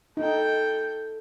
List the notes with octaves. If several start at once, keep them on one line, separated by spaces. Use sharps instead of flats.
D#4 A4 G5